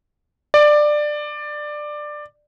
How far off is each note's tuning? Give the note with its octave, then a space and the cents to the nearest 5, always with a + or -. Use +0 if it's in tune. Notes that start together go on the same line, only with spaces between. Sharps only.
D5 +15